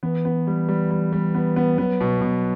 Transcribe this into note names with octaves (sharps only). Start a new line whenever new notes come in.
E3 B3
B3
G3
G3
G3
G3
B3
B3
F#3 B3
B2
B2